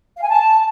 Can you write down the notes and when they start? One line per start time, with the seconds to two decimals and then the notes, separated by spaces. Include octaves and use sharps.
0.15 F5
0.22 G#5
0.29 A5